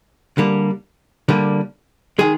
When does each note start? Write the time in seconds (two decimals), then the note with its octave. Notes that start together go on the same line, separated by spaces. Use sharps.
0.38 D3 G3 A#3
1.29 D3 G3 A#3
2.19 D#3 G#3 G#4